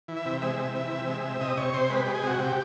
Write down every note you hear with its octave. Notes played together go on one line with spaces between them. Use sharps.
E3
E5
C3
G#3 E5
C3
E3
C3
G#3
C3
C3 D#5
C3 C#5
C3 C5
G#3 B4
G#3 G4
G#4
C3 F#4
C3 G4